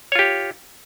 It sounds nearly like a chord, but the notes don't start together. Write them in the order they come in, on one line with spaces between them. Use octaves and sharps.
C#5 F4 G4